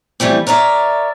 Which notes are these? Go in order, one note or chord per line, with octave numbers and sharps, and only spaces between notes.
E3 G3 A3 C4
A#4 C#5 D5 E5